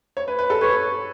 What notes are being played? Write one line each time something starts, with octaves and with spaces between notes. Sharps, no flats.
C#5
B4
B4
A4
B4 C#5